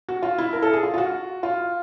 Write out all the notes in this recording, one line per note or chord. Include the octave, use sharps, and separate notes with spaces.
F#4
F4
E4
A#4
A4
G#4
F4
F4
F#4
F4